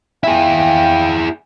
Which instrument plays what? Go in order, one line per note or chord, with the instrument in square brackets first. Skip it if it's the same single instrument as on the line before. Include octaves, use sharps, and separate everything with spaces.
[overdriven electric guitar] E4 G#4 [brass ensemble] F5 G5